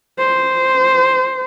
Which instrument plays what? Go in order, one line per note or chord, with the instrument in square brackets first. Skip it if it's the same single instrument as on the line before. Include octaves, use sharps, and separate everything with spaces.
[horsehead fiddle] C5